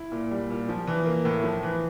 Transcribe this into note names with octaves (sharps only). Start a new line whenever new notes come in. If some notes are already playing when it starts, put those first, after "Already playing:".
Already playing: E4
A#2
G3
A#2
F3
E3
A#3
A2
F3
E3